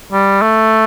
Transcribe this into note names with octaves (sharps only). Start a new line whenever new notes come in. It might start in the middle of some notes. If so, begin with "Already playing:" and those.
G3
A3